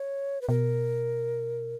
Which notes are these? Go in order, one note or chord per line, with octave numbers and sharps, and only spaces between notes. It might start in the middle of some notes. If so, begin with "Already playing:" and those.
Already playing: C#5
B4
B2 A#4